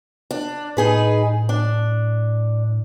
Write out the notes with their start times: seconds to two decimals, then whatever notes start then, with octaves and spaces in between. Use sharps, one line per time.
0.31 D4
0.77 A2 D#4 G#4 B4
1.49 D4